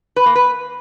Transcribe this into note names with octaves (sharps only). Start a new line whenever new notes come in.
B4
A#3
B4